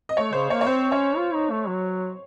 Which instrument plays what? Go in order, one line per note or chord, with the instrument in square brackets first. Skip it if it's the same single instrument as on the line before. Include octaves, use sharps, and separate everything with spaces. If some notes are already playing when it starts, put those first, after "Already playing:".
[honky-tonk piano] D#5
[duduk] A3 [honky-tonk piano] C#5
[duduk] C#3 [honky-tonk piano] C5
[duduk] A#3 [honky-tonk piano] C#5
[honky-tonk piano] C#5
[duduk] C4 [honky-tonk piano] C5
[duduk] C#4 [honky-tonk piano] C#5
[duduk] F4
D#4
A3
F#3